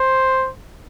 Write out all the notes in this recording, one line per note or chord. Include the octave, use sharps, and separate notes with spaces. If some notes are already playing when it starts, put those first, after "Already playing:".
Already playing: C5